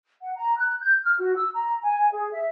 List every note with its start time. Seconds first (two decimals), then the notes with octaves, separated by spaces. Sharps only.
0.22 F#5
0.36 A#5
0.57 F#6
0.81 G6
1.02 F6
1.18 F#4
1.35 E6
1.54 A#5
1.82 G#5
2.11 G#4
2.31 E5